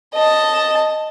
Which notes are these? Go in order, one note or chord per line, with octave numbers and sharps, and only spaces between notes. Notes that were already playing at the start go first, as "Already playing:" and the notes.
D#5 A5